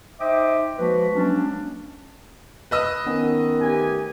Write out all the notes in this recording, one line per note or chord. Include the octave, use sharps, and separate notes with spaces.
D#4 C5 D#5 E5 G5 D6
F3 G#3 A#3 F#4 B4
F#3 G#3 A#3 C#4 D4
B4 D#5 E6
D#3 B3 C#4
A1 G4 G#5